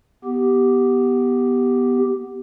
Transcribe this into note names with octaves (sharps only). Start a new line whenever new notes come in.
B3 G4